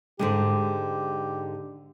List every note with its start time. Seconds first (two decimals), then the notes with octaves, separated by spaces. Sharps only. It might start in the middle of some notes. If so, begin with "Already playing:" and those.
0.19 G#2 D3 G#3 G4